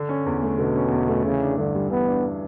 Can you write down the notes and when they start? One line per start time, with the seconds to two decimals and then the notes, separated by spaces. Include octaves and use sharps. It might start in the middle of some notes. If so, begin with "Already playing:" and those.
Already playing: D3 D4
0.09 C#4
0.26 E2
0.42 A3
0.58 B2 D3
0.76 C#4
0.92 E2
1.09 A3
1.25 C#3 E3
1.41 D4
1.57 G2 D3
1.75 G3
1.91 E3 B3
2.07 D4